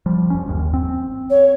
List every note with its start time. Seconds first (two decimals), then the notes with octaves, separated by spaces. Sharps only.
0.06 F3 G3
0.30 F#1 C#4
0.47 G1 D#2
0.74 C4
1.30 C#5